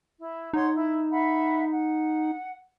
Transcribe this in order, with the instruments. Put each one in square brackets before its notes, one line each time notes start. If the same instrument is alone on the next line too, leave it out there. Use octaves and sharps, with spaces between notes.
[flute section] E4
[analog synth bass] D#4 [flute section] C#5 F#5 C6
[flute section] E4
E5 F#5 B5
F#5